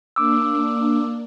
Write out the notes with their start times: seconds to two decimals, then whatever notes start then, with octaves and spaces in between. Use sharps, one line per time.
0.16 A#3 D4 D6 E6